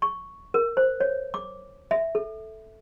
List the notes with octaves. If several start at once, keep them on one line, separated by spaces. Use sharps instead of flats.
C#6
A#4
C5
C#5
D6
E5
A4